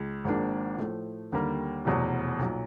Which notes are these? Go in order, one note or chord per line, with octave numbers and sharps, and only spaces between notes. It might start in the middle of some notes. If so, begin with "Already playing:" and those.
Already playing: C#2
G#1 G#2 F3 A#3 D4
A2 F3 A3
D#2 D3 G3 A#3
F1 E2 B2 F#3
B1 A#2 F#3